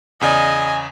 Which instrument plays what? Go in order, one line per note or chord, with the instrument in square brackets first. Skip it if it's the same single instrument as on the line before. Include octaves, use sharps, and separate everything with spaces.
[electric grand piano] E2 C#3 D5 [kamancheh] D#5 G#5